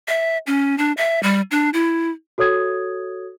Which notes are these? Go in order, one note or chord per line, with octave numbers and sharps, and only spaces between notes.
E5
C#4
D4
E5
G3
D4
E4
F#4 A4 C#5 D#6 G#6